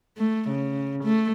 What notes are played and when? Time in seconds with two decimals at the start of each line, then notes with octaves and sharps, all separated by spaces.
0.17 A3
0.48 C#3
1.03 A3